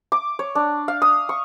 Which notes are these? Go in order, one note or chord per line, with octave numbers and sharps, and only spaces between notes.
D6
C#5
D4
F5
D#6
C#6